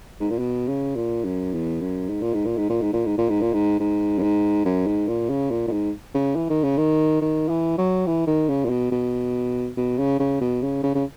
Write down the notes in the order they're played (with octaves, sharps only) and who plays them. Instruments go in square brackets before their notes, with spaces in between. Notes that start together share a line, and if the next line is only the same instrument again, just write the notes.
[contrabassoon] G#2
A#2
B2
C#3
A#2
F#2
E2
F#2
G#2
A#2
G#2
A#2
G#2
A#2
G#2
A#2
G#2
A#2
G#2
A#2
G#2
G#2
F#2
G#2
F#2
G#2
A#2
C#3
A#2
A#2
G#2
C#3
E3
D#3
C#3
D#3
D#3
E3
F#3
E3
D#3
C#3
A#2
B2
B2
B2
C#3
C#3
B2
C#3
C#3
C#3